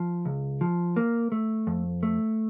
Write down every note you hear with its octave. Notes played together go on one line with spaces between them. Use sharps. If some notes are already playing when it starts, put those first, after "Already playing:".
Already playing: F3
C#2
F3
A#3
A3
F2
A3